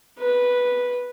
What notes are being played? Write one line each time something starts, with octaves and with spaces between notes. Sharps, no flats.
B4